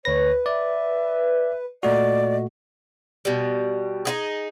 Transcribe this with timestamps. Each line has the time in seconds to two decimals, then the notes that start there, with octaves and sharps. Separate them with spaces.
0.05 D2 B4 C#5 A#6
0.46 D5 E5
1.83 A#2 A3 F#4 D5 D#5
3.25 B2 G3
4.05 D#4 F4 G#4